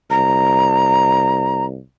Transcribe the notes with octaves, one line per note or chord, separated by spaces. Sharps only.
C2 A#5